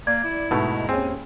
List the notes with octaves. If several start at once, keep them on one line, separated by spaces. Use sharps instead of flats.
A#3 D5 G#6
E4
G#2 B2 A3
D#2 C4 C#4 G#4